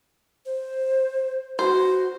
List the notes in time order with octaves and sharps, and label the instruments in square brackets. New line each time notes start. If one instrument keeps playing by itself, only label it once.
[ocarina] C5
[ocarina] F#4 [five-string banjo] C5